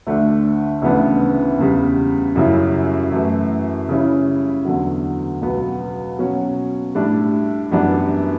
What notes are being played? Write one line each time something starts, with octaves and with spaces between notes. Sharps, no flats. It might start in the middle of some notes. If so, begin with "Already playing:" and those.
D2 D3 A3 D4
D2 C#3 E3 B3 D4
E2 C#3 G3
F#2 C#3 G3 C#4 E4
F#2 E3 A3
C#3 G3 C#4 E4
E2 D3 F#3
C#2 B2 F#3 B3
B2 F#3 C#4
A2 G3 D4
F#2 E3 G3 B3 D4